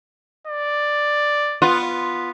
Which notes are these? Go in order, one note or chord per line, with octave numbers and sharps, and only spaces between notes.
D5
B3 F4